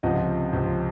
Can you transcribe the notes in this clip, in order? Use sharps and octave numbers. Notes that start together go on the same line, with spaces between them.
C#2 C3 F3 C4 D#5 F#5
C#2 C3 F3 C4